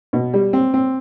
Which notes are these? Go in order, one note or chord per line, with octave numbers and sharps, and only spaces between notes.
B2
G3
C4
C4